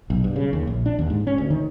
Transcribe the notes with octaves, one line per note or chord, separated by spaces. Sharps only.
B1
G2
C#3
D#2
A#1
D4
D#2
G#2
C#4
D2
D#3